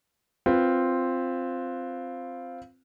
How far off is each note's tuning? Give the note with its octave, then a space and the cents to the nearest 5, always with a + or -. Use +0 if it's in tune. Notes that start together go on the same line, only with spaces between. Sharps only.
C4 +0 F4 +0 B4 +0